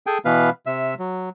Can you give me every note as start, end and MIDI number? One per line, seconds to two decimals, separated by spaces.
0.07 0.18 68
0.07 0.18 69
0.07 0.18 79
0.07 0.18 80
0.25 0.50 47
0.25 0.50 52
0.25 0.50 59
0.25 0.50 71
0.25 0.50 77
0.66 0.94 48
0.66 0.94 76
0.99 1.29 54